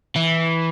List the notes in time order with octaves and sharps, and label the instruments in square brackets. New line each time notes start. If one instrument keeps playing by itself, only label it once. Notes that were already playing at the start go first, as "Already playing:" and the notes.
[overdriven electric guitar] E3